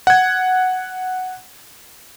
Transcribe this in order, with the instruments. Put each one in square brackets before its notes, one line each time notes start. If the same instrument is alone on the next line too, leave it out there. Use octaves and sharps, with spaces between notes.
[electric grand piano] F#5 G#6